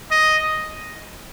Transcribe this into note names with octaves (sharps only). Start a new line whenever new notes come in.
D#5